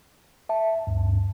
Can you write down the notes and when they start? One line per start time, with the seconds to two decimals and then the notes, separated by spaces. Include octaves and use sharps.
0.49 E5 A5
0.87 D2 G2